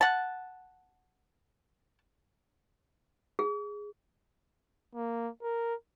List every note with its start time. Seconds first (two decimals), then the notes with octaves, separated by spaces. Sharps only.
0.01 F#5 A5
3.39 G#4
4.95 A#3
5.42 A#4